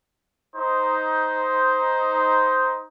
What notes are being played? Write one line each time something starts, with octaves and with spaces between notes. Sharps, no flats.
D#4 C5